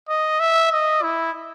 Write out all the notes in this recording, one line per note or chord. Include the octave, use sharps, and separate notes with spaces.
D#5
E5
D#5
E4